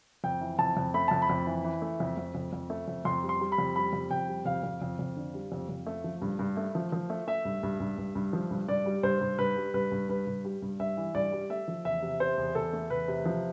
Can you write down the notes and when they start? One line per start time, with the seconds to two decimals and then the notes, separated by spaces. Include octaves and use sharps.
0.24 F2 G5
0.41 E3
0.59 F2 A5
0.77 F2
0.94 A3 B5
1.08 F2 A5
1.22 B5
1.30 F2
1.47 E3
1.65 E3
1.82 A3
2.00 F2
2.18 F2
2.35 F2
2.53 F2
2.70 A3
2.88 F2
3.05 F2 C6
3.23 G3
3.29 C6
3.40 G3
3.52 B5
3.58 F2
3.76 G3 B5
3.93 F2
4.11 F2 G5
4.28 G3
4.46 F2 F5
4.63 F2
4.82 F2
4.99 F2
5.16 D3
5.34 G3
5.52 F2
5.69 F2
5.87 A3
6.04 F3
6.22 G2
6.39 G2
6.57 A3
6.75 F3
6.92 F3
7.10 A3
7.28 A3 E5
7.45 G2
7.63 G2
7.80 G2
7.98 G2
8.15 G2
8.33 F3
8.51 G2
8.68 G2 D5
8.86 G3
9.03 G2 C5
9.21 G2
9.39 G2 B4
9.57 G3
9.74 G2 B4
9.92 G2
10.09 G2 B4
10.27 G2
10.45 G3
10.62 G2
10.80 G2 E5
10.97 E3
11.15 G2 D5
11.32 G3
11.50 A3 E5
11.68 F3
11.85 E2 E5
12.02 C3
12.20 C3 C5
12.38 E2
12.55 E2 A4
12.73 A3
12.90 E2 B4
13.08 C3
13.26 F3